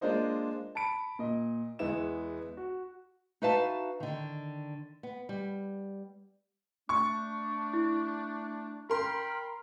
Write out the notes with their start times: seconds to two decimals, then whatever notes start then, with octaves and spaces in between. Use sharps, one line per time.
0.01 G#3 A#3 D4 F4 C5 D#5
0.75 A5 B5 D7
1.19 A#2 D#5
1.79 E2 G#3 B3 E4 E7
2.57 F#4
3.42 D#4 F#4 B4 E5 F5 A5
4.00 D3 D#3
5.03 B3
5.29 G3
6.89 A3 D4 C#6
7.73 E4
8.90 A#4 G5 B5 C6 F6